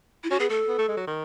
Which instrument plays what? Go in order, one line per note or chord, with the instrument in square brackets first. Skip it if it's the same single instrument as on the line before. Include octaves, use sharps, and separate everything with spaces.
[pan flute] E4
[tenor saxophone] C#4 [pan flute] F#4
[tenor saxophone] B3 [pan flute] G#4
[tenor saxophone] A3 [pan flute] A4
[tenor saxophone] B3
A3
G#3
F#3
D#3